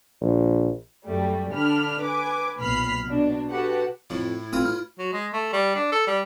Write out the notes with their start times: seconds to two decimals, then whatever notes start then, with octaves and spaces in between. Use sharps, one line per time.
0.21 A#1
1.07 F#2 G3 A3
1.54 D3 D4 B5 F6
2.03 B4 G#5 D6
2.60 B1 A#2 B5 F6 C7
3.07 B2 D4
3.50 F#4 G4 A4 B4 F#5
4.10 F2 A2 E4
4.53 A2 C4 F4 B4 D#6
4.66 F6
4.99 F#3
5.13 G#3
5.33 A3
5.53 G3
5.75 D4
5.92 A4
6.07 G3